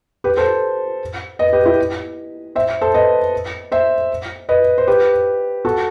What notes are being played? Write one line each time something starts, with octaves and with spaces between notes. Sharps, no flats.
G4 B4
A4 C5
B4 D#5
G4 B4
E4 G4
C5 E5
A4 C5
B4 D#5
C5 E5
B4 D#5
C5
G4 B4
F#4 A4